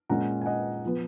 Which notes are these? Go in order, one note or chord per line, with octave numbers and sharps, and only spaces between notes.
A#2 G#3 C#4 F#5 A#5
G#5
D#5 F#5
F3 B3